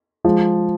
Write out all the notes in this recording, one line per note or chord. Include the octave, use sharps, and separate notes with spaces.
F3 G#3